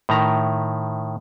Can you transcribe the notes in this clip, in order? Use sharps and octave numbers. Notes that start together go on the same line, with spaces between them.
A2 D#3 E5 A#5